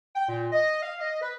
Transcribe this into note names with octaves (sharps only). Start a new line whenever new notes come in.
G5
A#2
D#5
F5
D#5
B4